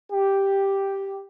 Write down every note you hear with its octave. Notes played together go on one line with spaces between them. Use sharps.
G4